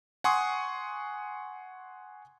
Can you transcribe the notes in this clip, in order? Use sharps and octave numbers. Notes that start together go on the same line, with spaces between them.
F#5 G#5 C6 C#6 D#6